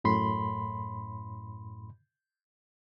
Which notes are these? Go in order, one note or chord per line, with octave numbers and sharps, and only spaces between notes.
F#2 A2 B5 C6